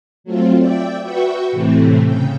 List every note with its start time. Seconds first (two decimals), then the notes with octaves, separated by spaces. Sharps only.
0.24 F#3 A3 C4 F4
0.58 D5 E5 G5
1.02 F#4 B4 E5 G5 C#6
1.52 A2 C3 E3 A3 C4
2.04 C#3 G5